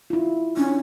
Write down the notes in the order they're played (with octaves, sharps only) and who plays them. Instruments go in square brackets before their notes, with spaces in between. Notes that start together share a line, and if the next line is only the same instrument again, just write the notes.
[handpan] E4 F4
[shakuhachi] C#4 [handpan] D4